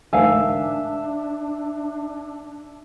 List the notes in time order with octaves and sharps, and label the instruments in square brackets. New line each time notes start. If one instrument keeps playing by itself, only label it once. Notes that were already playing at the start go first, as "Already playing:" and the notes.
[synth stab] A1 D2 G#2 [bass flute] D4 [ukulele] A#4 F5 G#5 [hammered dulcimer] E5